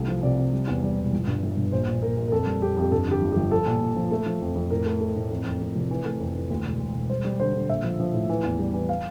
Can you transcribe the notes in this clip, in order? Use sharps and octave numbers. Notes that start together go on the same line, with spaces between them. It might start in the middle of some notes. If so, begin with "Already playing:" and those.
Already playing: C2 A3
F3
C3 D5
C3
G3
E2
G3
E1
G1
G2
G1
G2
A#1 C5
A#2
A#2 A#4
A#1
A#4
F2 A4
G3
F2 G4
F2 G4
G2 A4
D3 G4
G1
G4
G1
F3 A4
A#2
A#2
F3
A3
F3
F2
F2
A2 A#4
A3
A3
A2
F2
F2
F2
F1
E3
A3
F2
E3
D2
E1
E1
E1
G3 C5
G3
D3 C5
D3
A#1 E5
F3
F3
A2
E3
E2
G3
E3
F5